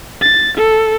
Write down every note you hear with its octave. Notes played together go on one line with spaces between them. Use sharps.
A6
A4